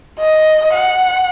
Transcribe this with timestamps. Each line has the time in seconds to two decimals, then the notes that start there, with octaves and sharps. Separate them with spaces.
0.19 D#5
0.73 F#5